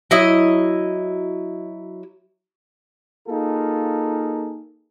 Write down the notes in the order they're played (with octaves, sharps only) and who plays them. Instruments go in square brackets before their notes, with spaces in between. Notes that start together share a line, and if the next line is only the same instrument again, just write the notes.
[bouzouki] F#3 E4 D#5
[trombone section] A#3 D#4 F4 G#4 A4